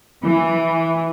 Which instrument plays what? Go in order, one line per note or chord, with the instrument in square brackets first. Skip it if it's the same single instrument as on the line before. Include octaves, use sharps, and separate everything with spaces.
[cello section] E3